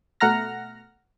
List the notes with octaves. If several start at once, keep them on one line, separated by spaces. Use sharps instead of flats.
B2 A3 F#5 A#5 F6 A#6